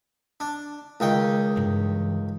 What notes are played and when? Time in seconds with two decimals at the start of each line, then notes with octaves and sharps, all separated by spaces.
0.40 D4
1.00 C#2 D#3 G5
1.56 G2 E3